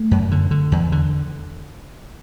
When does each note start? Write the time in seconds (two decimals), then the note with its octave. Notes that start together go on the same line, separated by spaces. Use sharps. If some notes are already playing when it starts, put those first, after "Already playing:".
Already playing: A3
0.11 F#2
0.31 D3
0.51 D3
0.72 E2
0.92 D3